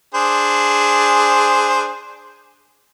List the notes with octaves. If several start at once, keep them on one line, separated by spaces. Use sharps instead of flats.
D4 G#4 C5